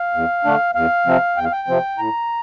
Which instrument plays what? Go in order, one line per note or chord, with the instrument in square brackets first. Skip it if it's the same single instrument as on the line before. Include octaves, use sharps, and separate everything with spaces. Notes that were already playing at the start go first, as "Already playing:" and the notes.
Already playing: [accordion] F5
E2
D3 A3 D4
E2 F5
C3 F3 C4
E2 G5
F5
G5
C3 F3 C4
A2 A#5